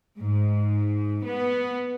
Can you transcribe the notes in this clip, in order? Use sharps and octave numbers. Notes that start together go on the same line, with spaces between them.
G#2
B3